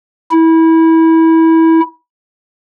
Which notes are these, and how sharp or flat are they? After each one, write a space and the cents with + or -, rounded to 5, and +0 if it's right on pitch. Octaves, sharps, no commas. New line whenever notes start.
E4 -20